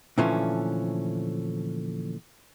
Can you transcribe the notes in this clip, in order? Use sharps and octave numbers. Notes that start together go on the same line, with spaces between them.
A#2 D3 E3 F3 A3 C#4